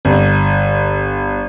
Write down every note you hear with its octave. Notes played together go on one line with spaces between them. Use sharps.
G1